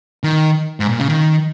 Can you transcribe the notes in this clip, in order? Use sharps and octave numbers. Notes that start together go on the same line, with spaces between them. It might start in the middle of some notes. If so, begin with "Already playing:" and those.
D#3
G#2
A#2
C#3
D#3